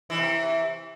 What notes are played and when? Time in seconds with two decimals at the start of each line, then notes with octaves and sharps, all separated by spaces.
0.10 E3
0.14 F2
0.17 C3